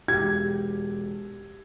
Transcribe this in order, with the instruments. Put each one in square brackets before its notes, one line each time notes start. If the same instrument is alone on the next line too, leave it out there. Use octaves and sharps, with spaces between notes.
[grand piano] E1 [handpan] G4 [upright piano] G#6